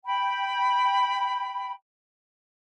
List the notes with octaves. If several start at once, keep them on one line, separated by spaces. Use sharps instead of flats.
G5 B5